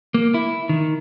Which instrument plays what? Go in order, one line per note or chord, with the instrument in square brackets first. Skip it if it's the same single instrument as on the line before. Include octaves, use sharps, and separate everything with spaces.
[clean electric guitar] A#3
E4
D#3